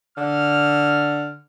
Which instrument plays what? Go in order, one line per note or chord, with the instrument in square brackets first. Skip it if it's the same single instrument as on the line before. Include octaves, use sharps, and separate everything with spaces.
[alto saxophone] D3 [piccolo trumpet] F6